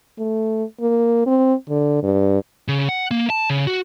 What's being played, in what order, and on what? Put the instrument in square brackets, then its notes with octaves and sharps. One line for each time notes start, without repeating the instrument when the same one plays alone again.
[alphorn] A3
A#3
C4
D3
G2
[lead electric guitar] C#3
F#5
A#3
A5
C#3
F#4